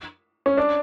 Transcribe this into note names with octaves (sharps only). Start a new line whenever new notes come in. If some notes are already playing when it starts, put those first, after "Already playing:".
C#4
D4